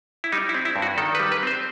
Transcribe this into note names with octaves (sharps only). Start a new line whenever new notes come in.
E4
G3 D#4
E4
C4
E4
G2
F#4
D#3 A4
B4
G3
B4
C4 C5